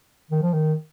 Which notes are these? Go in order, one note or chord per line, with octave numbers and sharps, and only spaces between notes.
D#3
F3
D#3